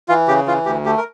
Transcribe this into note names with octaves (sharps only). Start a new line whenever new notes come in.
E3 F4
C#3 G4
E3 F4
D2 G4
A3 G4
A#4